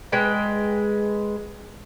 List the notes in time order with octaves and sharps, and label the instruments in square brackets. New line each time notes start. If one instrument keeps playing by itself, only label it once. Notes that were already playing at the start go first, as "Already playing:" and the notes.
[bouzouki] G#3 B4 G5